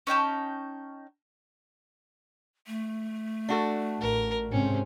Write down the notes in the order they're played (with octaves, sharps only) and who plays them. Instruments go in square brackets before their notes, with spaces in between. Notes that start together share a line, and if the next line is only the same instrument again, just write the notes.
[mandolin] C#4 D#4 G5 A5
[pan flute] A3
[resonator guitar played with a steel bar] D4 F#4 A4
[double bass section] A1 [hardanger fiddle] A#4
[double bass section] G#2 C3 C4 [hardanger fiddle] C#4